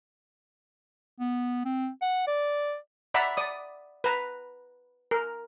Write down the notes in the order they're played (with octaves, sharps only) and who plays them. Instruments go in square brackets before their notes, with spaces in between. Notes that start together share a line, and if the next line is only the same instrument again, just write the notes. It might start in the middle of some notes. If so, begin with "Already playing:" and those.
[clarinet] B3
C4
F#5
D5
[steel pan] D5 E5 F#5 A#5 B5 E6
D5 D#6
B4 A#5
A#4